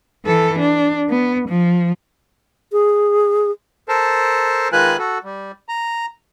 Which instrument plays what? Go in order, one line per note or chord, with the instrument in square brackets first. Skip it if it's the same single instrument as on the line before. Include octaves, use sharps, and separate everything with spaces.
[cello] E3 A4
D4
B3
F3
[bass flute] G#4
[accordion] A4 A#4 C5 A5
D#3 G#3 F4 B4 G#5 F#6
F#4 A4
G3
A#5